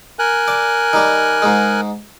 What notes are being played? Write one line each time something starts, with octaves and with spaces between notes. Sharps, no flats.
A#4 G#5 F#6
D5
D#3 G3
G#2 G#3